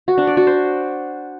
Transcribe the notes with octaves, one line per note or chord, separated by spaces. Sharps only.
F#4
D4
D5
F#4
C5